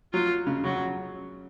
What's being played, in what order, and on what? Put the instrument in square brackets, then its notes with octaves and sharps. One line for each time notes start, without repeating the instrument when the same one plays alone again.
[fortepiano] F#3 [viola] F4
[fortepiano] C#3
[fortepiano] C#3 [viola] F#3